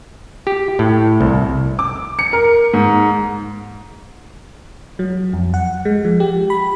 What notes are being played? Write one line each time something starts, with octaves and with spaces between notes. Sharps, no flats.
G4
A2
C2
D6
C#7
A#4
G#2
F#3
F2
F#5
G#3
F3
G4
B5